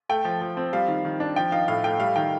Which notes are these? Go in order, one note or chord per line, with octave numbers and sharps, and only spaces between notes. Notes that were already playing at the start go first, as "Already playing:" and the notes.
A3 G5
F3
F3
C4
G3 F5
D#3
D#3
D4
F3 G5
D#4 F5
A2 F5
A3 G5
G3 F5
D#3 G5